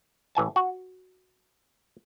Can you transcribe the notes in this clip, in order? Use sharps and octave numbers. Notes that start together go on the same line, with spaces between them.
A1 E3 G#5 A5
F#4